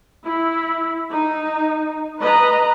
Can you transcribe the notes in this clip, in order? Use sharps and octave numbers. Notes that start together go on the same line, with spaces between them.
E4
D#4
B4 D#5 A#5